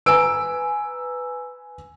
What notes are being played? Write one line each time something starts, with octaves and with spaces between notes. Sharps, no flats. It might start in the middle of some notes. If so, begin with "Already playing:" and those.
B4 G#5 A#5 E6 D7